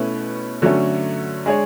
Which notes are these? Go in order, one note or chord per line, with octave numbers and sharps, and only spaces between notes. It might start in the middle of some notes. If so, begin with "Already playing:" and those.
Already playing: B2 A3 C#4 E4 B4
D3 F#3 A3 C#4
G#3 D4 G#4 C#5